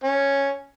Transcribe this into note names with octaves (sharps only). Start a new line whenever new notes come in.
C#4